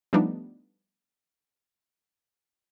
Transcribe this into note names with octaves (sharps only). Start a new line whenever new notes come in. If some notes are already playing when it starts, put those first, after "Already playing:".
F3 G3 A3 B3 D4 D#4